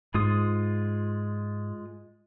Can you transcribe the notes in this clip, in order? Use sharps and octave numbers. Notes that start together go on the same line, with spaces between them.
G#2 G#3 F4 D#6